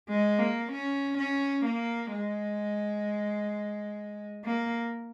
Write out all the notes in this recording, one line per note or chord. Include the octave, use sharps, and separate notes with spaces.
G#3
A#3
C#4
C#4
A#3
G#3
A#3